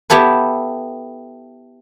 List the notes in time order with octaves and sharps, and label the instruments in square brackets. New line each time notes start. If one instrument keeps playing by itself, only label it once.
[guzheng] B3 E4 G4 A4 B4